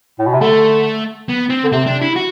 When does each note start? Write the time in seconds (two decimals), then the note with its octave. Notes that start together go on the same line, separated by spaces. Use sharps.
0.19 A2
0.27 B2
0.34 C3
0.41 D3 A3
1.29 B3
1.50 C4
1.64 D3
1.72 C3 C4
1.86 D4
2.01 E4
2.16 F#4